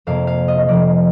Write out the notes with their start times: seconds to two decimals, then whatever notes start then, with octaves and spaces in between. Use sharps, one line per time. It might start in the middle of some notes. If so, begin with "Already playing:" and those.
0.07 F2 C3 F3 A#3 F5
0.27 F5
0.48 D#5
0.68 F2 C3 F3 D5